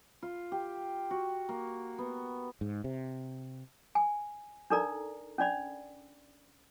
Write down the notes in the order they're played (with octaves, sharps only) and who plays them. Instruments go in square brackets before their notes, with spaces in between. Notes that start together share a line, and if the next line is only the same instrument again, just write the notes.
[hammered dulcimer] F4
G4
F#4
A#3
B3
[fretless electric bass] G#2
C3
[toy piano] G#5
D4 D#4 A4 A#4 D5 A#5
C#4 D4 D5 B5